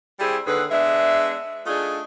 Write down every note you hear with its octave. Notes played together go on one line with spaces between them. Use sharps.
G3 C4 E4 G4 G#4
D#2 D3 G#4 B4
G#3 B3 D4 E5
A3 D4 D#4 F4 G#4